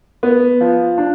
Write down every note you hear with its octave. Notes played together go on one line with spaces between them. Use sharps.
B3
F3
D4